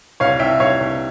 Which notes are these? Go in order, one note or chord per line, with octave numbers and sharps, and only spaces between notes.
C2 C#5 F5
C2 E5 G5
C2 C#5 F5
C2